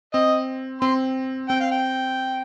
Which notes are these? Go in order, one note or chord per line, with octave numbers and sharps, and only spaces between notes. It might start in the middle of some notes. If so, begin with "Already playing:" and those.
C4 D#5
C4 C6
C4 G5
F5
G5